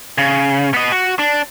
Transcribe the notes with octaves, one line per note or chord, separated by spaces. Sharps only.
C#3
B3 D#5
F#4
D4